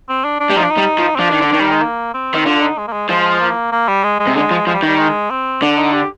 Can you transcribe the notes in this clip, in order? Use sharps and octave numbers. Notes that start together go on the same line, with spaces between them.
C4
D4
D4
G3
F3 D#4
D4
D#4
G3
F3
C4
F3 D4
D#3
D3
D#3
G3
G#3
A#3
C4
D#3
D3 F4
D#4
G#3
A#3
G#3
F3 G#3
A#3
A#3
G3
G#3
G#3
C3
D3 G#3
F3
F3 G#3
G3
D#3
G3
G#3
C4
D3 D4
D#4
G4